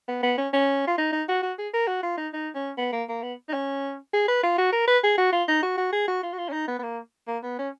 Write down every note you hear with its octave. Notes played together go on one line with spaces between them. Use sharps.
B3
B3
C#4
C#4
F4
D#4
D#4
F#4
F#4
G#4
A#4
F#4
F4
D#4
D#4
C#4
B3
A#3
A#3
B3
D#4
C#4
G#4
B4
F4
F#4
A#4
B4
G#4
F#4
F4
D#4
F#4
F#4
G#4
F#4
F4
F#4
F4
C#4
D#4
B3
B3
A#3
A#3
B3
C#4